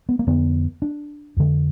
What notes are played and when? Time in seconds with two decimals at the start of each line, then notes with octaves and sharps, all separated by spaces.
0.09 B3
0.19 A#3
0.27 F2 D3 B3
0.82 D4
1.37 F2 D3